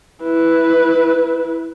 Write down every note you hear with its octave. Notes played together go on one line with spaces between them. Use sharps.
E4 B4